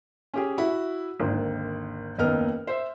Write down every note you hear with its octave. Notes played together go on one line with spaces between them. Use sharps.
C#4 G4 G#4
E4 F#4 B5
G#1 D#2 D3
F#1 D#2 B3 D#5 F6
C5 E5